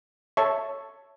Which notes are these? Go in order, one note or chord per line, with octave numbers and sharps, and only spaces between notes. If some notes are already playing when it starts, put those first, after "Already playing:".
A4 C#5 E5 A5 C#6